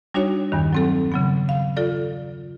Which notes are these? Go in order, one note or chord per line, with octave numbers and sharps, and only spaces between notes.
G3 D4 D#4 F#4 C#5
E2 G2 D#3
F#3 C4 A4
C#3 F#3 B3
F5
F4 A4 D5